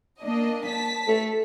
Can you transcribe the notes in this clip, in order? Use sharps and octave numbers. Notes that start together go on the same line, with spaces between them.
A#3 D4 D#5
A5 B6
A3